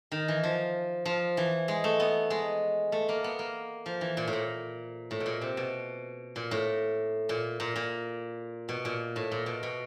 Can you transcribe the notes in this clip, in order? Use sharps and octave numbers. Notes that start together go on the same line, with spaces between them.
D#3
E3
F3
F3
E3
G#3
A3
B3
G#3
A3
A#3
B3
A#3
F3
E3
A#2
A2
A#2
A2
B2
A#2
C3
B2
A#2
A2
A#2
A#2
A#2
B2
A#2
A2
A#2
B2
B2